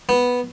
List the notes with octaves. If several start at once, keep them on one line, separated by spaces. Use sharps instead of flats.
B3